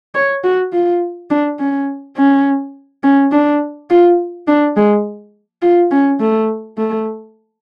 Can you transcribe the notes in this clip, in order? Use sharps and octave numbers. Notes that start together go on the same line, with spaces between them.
C#5
F#4
F4
D4
C#4
C#4
C#4
D4
F4
D4
G#3
F4
C#4
A3
A3